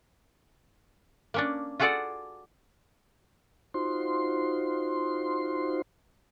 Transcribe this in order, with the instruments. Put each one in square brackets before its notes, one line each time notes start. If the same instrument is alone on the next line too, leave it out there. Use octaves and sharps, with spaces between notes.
[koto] A#3 C#4 D4
F4 F#4 G#4 A4 D5 F#5
[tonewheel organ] D#4 F4 F#4 C5 C6